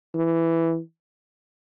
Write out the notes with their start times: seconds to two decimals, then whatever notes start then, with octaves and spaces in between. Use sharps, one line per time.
0.15 E3